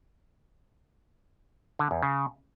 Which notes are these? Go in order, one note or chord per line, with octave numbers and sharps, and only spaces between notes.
D3
E2
C#3